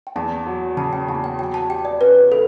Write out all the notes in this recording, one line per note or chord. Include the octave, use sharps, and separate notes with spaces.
G5
E2 A5
F#3
C#3 A5
G5
E2 A5
G5
F#3 G5
A5
G4 G5
D5
C#4 B4
A4 B4